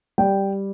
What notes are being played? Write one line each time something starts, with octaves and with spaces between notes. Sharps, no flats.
G3 G5